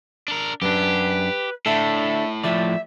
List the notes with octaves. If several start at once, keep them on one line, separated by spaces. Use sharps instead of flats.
D4 A#4
F#2 D4 G4 B4
A2 A3 D4 A4 E5
F3 A3 D5 E5